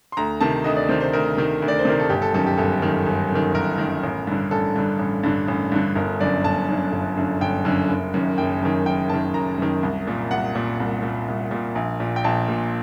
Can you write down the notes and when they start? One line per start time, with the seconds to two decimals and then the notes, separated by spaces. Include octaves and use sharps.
0.12 C6
0.17 D2 A#5
0.41 C3 D#3 A5
0.64 D2 D#5
0.77 D5
0.89 C3 D#3 C5
1.00 C5
1.13 D2 A#4
1.37 C3 D#3
1.62 D2
1.68 D5
1.79 C5
1.85 C3 D#3 A#4
2.00 A4
2.10 G1 G4
2.22 A4
2.34 F#2 D#3 A4
2.46 G4
2.57 G1 A4
2.82 F#2 D#3
3.06 G1
3.31 F#2 D#3
3.54 G1 A#4
3.78 F#2 D#3
4.03 A1
4.27 G2 D3
4.51 A1 A4
4.75 G2 D3
4.99 A1
5.23 G2 D3
5.48 A1
5.72 G2 D3
5.96 G1 A#4
6.20 F#2 D3 D5
6.44 G1 A5
6.69 F#2 D3
6.92 G1
7.17 F#2 D3
7.41 G1 G5
7.65 F#2 D3
7.89 F#1
8.14 F#2 D#3
8.38 F#1 G5
8.62 F#2 D#3
8.86 F#1 G5
9.09 F#2 D#3 A5
9.34 F#1 A#5
9.58 F#2 D#3
9.83 C2
10.07 A#2
10.31 C2 F#5
10.55 A#2
10.80 C2
11.03 A#2
11.28 C2
11.51 A#2
11.75 A#1
12.00 A#2
12.16 G5
12.24 A#1 A5
12.48 A#2